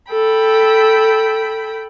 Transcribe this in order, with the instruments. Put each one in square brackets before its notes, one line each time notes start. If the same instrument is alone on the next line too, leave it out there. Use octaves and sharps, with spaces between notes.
[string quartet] A4 G5 B5